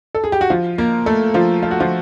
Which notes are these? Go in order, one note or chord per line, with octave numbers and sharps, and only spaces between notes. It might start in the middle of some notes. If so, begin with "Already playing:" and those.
A4
G#4
G4
F#4
F3 F4
A#3 A#4
A3 A4
F3 F4
F4
F#4
F3 F4